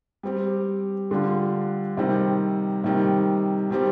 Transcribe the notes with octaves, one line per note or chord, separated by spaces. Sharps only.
G3 C4 G4
D3 G3 D4 F4
C3 D#3 G3 C4
C3 D#3 G3
D#3 G3 C4 G4